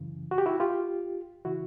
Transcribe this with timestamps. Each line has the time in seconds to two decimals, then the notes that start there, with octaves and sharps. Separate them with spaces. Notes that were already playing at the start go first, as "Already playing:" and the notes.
Already playing: F#2 C#3 E3
0.31 F#4
0.38 G4
0.46 E4 F#4
0.60 F4 G4
1.45 C#3 E3 E4 F#4